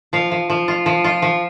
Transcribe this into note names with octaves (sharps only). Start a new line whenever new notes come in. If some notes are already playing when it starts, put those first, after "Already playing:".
F3 F5
F3
F3
F4
F3
F4
F3